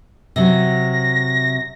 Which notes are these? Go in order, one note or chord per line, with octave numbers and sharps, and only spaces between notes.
C3 F#3 A#6